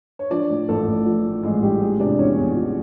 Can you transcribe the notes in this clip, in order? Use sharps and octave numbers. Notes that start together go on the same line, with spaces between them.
C#5
F3 D4 D5
A2
A1 A3 A4
A1
F3
A2
A1 G#3 G#4
A1 G3 G4
F3 G#3 G#4
C3 D4 D5
E2 C#4 C#5
E2
F3